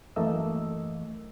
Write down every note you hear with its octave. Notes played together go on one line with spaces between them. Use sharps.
F#2 E3 A3 A#3 D#5 E6